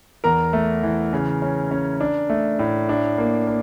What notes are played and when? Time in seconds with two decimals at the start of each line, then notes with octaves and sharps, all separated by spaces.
0.24 E2 A#4 A#5
0.53 A3
0.83 E3
1.13 C#3
1.42 C#4
1.71 C#4
2.01 D4
2.30 A3
2.59 A2
2.89 D4
3.18 A#3
3.47 A#3